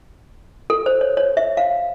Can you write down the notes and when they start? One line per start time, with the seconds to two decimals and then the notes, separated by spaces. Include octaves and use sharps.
0.70 A4
0.86 C5
1.01 C#5
1.17 C#5
1.37 E5
1.57 F5